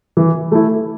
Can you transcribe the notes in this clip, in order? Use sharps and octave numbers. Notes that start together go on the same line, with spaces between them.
E3
A3 E4